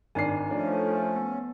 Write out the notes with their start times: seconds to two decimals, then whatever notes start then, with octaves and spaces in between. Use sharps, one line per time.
0.15 G#1 D4 D#4 G#5 C7
0.50 F3 A3 C#4 D4
1.16 B3